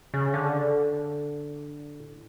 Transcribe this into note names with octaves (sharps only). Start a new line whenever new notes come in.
C#3
D3
A2